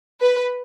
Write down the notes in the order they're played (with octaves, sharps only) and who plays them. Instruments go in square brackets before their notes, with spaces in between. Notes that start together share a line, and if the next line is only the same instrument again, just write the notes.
[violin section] B4